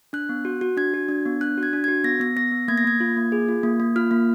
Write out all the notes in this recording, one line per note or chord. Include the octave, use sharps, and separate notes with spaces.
D4 F#6
B3
F#4
F#4
D4 G#6
F#4
D4
B3
D4 F#6
F#4
G#6
D4
F#4 G#6
B3 A#6
B3 A#6
B3 A#6
B3
A#3 G#6
A#6
A#3 G#6
F4
A#3
G#4
F4
A#3
A#3
F4 F6
A#3